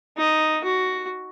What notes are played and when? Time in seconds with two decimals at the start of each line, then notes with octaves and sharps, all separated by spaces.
0.17 D#4
0.64 F#4